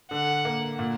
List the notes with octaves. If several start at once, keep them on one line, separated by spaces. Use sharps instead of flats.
D3 F#5
A#3
A#2